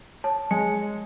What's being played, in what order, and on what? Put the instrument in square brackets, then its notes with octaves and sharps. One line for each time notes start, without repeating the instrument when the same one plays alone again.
[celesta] C#5 A5
[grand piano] G#3 [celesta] C#7